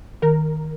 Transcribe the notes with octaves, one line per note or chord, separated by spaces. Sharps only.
D#3 A#4